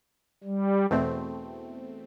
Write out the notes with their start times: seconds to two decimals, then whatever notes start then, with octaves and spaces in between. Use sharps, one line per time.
0.44 G3
0.91 E2 B2 A3 C4